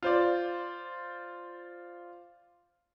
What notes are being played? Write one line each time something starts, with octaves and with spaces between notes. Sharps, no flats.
F4 C5 D5